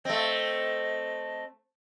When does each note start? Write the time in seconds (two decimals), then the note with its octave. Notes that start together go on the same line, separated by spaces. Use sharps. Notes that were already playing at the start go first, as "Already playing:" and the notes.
0.05 A3 C4 D#5